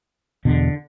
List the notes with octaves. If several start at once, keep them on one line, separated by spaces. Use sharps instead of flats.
E2 B2 D3